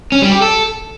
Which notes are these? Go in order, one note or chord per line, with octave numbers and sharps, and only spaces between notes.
C#4
G3
G4
A4